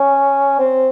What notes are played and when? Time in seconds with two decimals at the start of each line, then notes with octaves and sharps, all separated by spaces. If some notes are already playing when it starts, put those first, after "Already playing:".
Already playing: C#4
0.59 C4